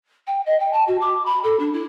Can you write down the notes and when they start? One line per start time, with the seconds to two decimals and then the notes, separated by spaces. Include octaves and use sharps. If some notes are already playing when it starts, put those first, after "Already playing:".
0.27 G5
0.46 D#5
0.60 G5
0.73 A5
0.87 F#4
1.01 D6
1.26 B5
1.44 A4
1.59 D4
1.73 E4